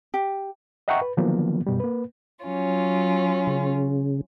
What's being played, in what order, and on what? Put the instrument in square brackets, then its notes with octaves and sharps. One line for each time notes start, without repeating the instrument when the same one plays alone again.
[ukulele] G4
[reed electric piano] D#5 E5 F#5 G5 A#5 C#6
B4
D3 D#3 F3 F#3 A#3 B3
F#2 B2 G3
A#3 B4
[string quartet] F#3 C#4 F4
[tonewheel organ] C#3